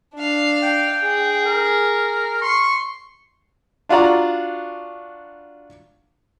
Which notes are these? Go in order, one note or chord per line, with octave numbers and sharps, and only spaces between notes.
D4 F5
G5
G#4
A#4
C6 C#6
D4 F4 F#4 D5 A#5